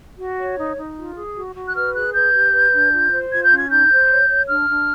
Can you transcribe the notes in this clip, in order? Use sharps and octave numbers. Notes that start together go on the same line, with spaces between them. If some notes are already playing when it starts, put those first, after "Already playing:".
F#4
C#5
D#4
D#4
F4
G#4
F#4
F#4
F#6
B4 F6
G#4 F#6
B4 G6
G4
B4
D4
F4
C5
F4 G#6
G6
C#4
G#6
D#4 G6
C5
C#5
C#5
D4 F6
D4